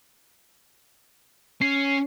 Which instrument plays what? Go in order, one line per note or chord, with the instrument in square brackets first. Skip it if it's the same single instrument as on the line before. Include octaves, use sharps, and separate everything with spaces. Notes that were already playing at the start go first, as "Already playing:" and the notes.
[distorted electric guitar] C#4 [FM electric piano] C7